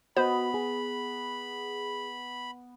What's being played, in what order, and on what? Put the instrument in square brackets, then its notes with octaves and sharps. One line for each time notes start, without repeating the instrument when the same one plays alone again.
[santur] B3 [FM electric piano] F#4 D#5 [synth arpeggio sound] C5 [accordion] B5
[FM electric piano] G#4